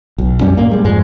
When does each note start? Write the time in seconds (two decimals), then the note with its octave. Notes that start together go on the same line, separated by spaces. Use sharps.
0.18 B1
0.41 F#2 G3 C#4
0.57 G2 A#2 A#3
0.71 G3 G#3
0.84 F2 G#2 G#3